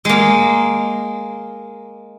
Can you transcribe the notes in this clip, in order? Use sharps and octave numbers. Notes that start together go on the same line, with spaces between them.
G#3 A#3